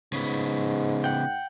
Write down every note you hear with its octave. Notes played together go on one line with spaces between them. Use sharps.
G#2 C#3 B3
F#5 G5